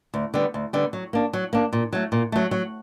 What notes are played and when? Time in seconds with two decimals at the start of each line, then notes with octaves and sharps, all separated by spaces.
0.14 D2
0.34 D3 G3 B3
0.54 D2
0.73 D3 G3 B3
0.93 F#3
1.13 A#3 D4
1.33 F#3
1.53 A#3 D4
1.73 A#2
1.93 F#3 A3
2.12 A#2
2.32 F#3 A3
2.51 F#3